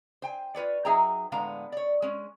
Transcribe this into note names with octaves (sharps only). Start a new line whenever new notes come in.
C5 G5 G#5
F4 B4 C#5 D5
F#3 D#4 G#4 E5 G5 A#5
A2 D3 G#3 B3 F5 A#5
C#5 D5
G#3 C#4